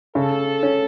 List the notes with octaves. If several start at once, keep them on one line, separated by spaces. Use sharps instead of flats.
C#3 A4
C#4